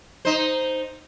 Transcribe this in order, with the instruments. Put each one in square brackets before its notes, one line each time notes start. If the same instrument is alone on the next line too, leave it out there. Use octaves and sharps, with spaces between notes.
[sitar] D#4 C5